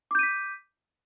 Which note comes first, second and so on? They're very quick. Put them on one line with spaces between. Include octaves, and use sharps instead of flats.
D6 G6 D#7 B6